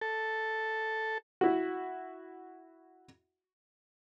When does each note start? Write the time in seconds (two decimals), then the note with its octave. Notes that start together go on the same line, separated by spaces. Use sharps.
0.01 A4
1.41 E4 F#4